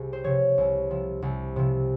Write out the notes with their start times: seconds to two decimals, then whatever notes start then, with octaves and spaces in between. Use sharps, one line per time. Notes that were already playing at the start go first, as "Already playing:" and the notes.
Already playing: C2 C3 G#4
0.13 C5
0.24 C3 F3 C#5
0.58 C2
0.90 C3 F3
1.22 C2
1.56 C3 F3